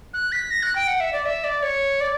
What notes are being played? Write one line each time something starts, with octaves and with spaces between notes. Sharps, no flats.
F#6
B6
A#6
F#6
G5
F#5
E5
D5
E5
D5
C#5
D5